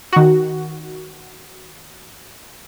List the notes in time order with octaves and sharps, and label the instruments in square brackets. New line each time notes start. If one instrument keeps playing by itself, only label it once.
[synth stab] D#3 F#4